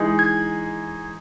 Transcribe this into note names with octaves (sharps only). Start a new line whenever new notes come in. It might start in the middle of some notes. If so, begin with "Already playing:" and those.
Already playing: E3 G#3 D#4 G#4
G#6